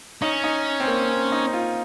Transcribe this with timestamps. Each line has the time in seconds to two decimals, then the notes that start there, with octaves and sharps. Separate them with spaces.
0.22 C#4 D#4
0.44 D#4
0.80 C4
0.87 A#3
1.10 C4
1.32 D#4
1.53 F4